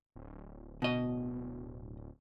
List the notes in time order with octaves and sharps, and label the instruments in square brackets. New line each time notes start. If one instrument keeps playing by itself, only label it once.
[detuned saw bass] D1
[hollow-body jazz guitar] B2 D#5